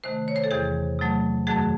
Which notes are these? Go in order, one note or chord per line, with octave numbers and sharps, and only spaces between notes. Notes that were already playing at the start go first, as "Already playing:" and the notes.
C3 D#3 A3 C5
C#5
C5
A4
E2 C3 E3 G#4
C3 F#3 A3
F#2 D#3 F#3 A3 G#4